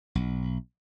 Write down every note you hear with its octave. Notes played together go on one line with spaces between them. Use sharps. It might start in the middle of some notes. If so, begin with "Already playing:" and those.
B1